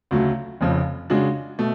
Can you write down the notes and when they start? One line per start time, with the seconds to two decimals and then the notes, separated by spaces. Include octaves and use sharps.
0.11 D2 C#3 F#3 A3
0.61 F1 F2 C#3 F3
1.10 C#3 G#3 D4 F#4
1.59 B2 A3